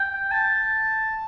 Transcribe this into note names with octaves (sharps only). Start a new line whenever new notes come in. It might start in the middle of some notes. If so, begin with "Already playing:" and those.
Already playing: G5
A5